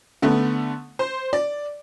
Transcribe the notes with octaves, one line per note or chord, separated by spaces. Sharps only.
D3 A3 B3
C5
D5